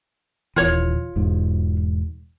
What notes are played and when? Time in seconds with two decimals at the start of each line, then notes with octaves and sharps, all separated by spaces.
0.56 D#1 E3 F4 C#5
1.16 E1 G#2